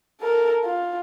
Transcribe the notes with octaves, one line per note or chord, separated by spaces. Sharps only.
A4 A#4
F4